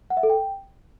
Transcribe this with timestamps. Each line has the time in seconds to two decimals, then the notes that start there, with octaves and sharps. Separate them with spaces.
0.10 F#5
0.17 E5
0.23 A4
0.30 G5